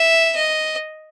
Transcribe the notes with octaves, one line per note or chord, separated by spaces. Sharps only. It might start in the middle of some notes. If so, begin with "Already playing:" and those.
Already playing: E5
D#5